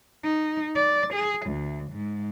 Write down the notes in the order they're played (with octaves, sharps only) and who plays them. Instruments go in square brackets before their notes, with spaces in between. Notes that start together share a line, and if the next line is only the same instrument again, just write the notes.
[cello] D#4
D5
G#4
D2
G#2